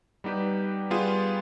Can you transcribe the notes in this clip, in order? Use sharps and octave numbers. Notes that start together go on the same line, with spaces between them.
G3 B3 D#4 G4 B4
G3 B3 F4 G#4